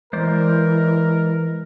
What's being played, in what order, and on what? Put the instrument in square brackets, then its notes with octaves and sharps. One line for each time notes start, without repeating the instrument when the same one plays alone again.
[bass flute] E3 [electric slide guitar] G#3 C5 D5 [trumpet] A#4